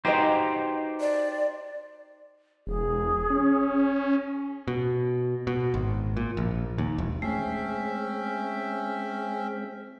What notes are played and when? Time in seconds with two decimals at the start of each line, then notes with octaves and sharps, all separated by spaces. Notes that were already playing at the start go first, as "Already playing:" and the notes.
0.05 D#4 F#4 G4 B4 C5 D#5
1.01 D5
2.67 E1 G#4
3.30 C#4
4.68 B2
5.47 B2
5.74 G#1
6.17 A#2
6.37 A#1
6.78 D#2
6.98 E1
7.22 G#3 A3 C4 C#4 E5 G5